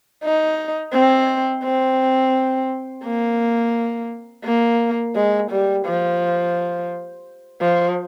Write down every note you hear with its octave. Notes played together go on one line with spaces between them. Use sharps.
D#4
C4
C4
A#3
A#3
G#3
G3
F3
F3